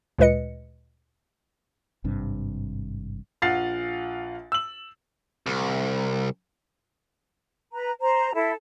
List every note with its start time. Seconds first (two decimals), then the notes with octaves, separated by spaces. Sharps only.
0.18 D2 A#2 G#3 B4 D#5 C#7
2.04 G#1 G2 C3 D4
3.42 A#1 F4 F5 F#5 A6 C7
4.52 E6 F#7
5.46 C2
7.72 B4 A#5
8.01 C5 A#5
8.34 E4 A4